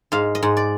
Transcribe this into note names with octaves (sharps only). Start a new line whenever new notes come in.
G#2 F5
D#5
G#2
D5